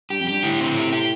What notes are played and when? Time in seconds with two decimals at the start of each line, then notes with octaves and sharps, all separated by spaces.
0.10 G2 G4
0.21 F2
0.27 G2 G4
0.43 A2 D3
0.60 C4
0.76 G4
0.92 G4